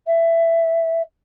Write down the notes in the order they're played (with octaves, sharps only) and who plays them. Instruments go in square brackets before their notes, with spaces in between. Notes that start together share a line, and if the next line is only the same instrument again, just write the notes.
[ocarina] E5